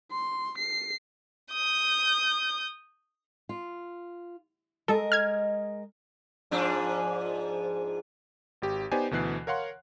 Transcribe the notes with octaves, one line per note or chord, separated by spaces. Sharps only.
C6
C7
D#6 G6
F4
G#3 A4 A#4 D#5
F6 G#6
G#2 F3 D4
G#1 G4
B3 D#4 G4 C5 D5 G#5
D2 B2 E3 F#6 C7
A#4 C#5 F5 F#5 C6